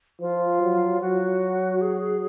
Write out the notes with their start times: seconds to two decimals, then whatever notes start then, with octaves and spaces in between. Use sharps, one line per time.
0.21 F3 F4
0.62 F#3
1.01 F#3 F#4
1.81 G#4